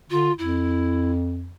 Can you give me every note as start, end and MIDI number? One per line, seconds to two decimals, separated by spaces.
0.10 0.31 50
0.10 0.32 65
0.38 1.55 41
0.38 1.11 64